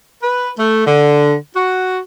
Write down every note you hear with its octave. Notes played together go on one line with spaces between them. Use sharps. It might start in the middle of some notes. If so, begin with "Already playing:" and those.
B4
A3
D3
F#4